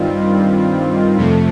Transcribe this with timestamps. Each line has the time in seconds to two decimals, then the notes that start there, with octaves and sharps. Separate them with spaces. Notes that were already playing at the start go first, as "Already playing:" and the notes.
Already playing: G2 D#3 G3 C4 F4
1.17 F2 C3 F3 A3